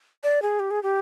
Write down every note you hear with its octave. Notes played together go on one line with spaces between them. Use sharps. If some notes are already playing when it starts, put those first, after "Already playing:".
D5
G#4
G4
G#4
G4